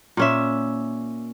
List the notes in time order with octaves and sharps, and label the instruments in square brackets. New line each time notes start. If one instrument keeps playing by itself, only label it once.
[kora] A#2 C#4 E5